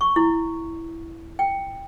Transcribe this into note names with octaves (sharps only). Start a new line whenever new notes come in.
C#6
E4
G5